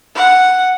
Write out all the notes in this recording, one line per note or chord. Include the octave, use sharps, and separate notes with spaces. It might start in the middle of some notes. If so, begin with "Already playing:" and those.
F#5